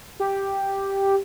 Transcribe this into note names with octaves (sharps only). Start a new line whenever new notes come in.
G4